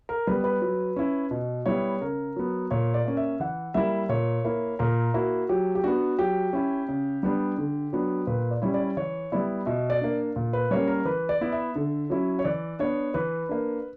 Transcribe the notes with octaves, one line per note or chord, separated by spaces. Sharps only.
A#4
G3 B3 B4
B4
F#3
C#4 E4
B2
G3 B3 E4 C#5
C#3 A#4
F#3 B3
A#2 C#5
D5
A#3 C#4
E5
E3 F#5
G3 A#3 E4 E5
A#2 C#5
A#3 E4
A#2 A#4
A#3 E4 F#4
F#3 G4
G4
B3 D4 F#4
F#3 G4
C#4 E4
C#3
G3 B3 D4
D3
F#3 B3 D4
A#2 B4
D5
G3 C#4 E4
D5
E3 C#5
G3 B3 E4 D5
B2 E5
D5
A#3 D4
A#2
B4
G3 A#3 C#4 C#5
A#4
E3 B4
D5
B3 E4
E5
D3
F#3 C#4 E4
C#5
E3 D5
B3 D4 C#5
E3 B4
A#3 D4